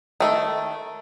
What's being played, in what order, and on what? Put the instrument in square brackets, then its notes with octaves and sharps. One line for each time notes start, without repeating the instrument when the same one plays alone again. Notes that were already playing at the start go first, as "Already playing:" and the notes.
[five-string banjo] D#3 A3